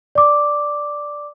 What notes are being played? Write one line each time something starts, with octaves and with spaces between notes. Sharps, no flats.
D5 D6